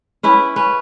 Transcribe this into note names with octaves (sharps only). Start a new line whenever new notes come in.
C#4 E4 B4
C#4 B4